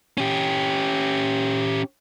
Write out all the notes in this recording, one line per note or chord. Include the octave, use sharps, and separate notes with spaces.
C#4 G4